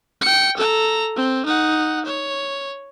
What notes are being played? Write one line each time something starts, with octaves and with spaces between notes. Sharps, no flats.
G5 C#7
A4 A#5
C4
D#4 F#5
C#5